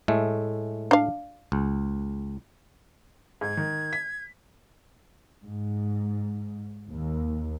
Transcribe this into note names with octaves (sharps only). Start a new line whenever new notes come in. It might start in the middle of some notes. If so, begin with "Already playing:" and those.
A2 G#3 A3
D4 F5
C#2
G#2 G#6
D#3
B6
G#2
D#2